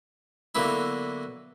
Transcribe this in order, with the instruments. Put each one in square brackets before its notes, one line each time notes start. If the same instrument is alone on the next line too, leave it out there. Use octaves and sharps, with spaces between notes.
[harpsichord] D3 F#3 A#3 B3 E4